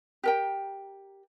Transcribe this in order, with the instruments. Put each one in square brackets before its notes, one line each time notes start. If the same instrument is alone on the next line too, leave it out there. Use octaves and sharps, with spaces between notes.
[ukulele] G4 A#4 G5